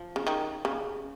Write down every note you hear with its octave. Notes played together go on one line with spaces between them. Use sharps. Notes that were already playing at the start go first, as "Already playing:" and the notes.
Already playing: F3
C#3
D#3
C#3